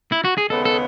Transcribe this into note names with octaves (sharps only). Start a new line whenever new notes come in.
E4
F#4
G#4
D#2 C#3 G#3 B3 A4
A4